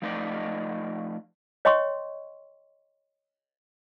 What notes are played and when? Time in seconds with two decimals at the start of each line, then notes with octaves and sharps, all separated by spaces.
0.02 F3 A3 D#4 B4 D5 D#5
1.65 C#5 D#5 G5 C6 C#6